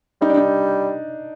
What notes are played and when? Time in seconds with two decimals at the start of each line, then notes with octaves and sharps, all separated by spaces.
0.21 G3 D#4
0.30 D4
0.37 D#4